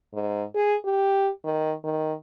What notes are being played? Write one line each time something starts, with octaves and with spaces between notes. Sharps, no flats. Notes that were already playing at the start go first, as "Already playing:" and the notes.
G#2
G#4
G4
D#3
D#3